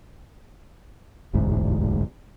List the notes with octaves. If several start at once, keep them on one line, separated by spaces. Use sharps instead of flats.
E1 A1 D2 G#2